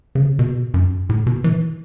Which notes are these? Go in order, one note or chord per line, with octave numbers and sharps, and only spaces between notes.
C#3
B2
F#2
A2
B2
E3